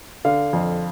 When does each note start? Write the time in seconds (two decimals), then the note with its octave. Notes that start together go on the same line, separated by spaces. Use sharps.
0.25 D3 F5
0.53 F2